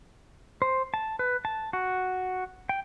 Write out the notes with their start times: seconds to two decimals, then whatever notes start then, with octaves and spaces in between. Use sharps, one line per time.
0.62 C5
0.94 A5
1.19 B4
1.45 A5
1.73 F#4
2.69 G5